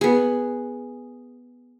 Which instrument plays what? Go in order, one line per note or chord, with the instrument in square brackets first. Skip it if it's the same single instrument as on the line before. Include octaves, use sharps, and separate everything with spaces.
[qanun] B3 G#4